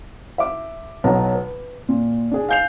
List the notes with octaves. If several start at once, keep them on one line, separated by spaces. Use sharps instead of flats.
E5 D6
B1 F#3 B3 A5 A#5
B4
A#2
D4 G#4
F5 G#5 G6 C7 F7